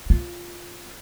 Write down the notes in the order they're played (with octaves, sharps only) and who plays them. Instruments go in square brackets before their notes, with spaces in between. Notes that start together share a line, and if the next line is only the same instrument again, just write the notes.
[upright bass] F4